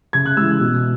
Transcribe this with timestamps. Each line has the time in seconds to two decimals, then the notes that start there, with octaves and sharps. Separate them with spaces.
0.13 C#3 G#6
0.26 F#6
0.37 G#3 E6
0.41 E3
0.60 B2